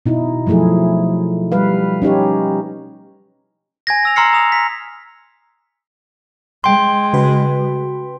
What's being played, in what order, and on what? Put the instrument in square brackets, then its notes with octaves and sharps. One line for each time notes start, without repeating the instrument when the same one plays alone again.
[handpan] B2 D#4 E4
F3 F#3 A3 E4 G#4
G3 B4 F5
C#4 D#4 G4 C#5
[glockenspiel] G#5 G#6 A#6
G#5 E6 F7
A#5 C6 E6 F6 C7 C#7
A#5 D#6 F7
B6
[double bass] G#3 [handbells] G5 C6
[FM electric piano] C#3 F#4 B4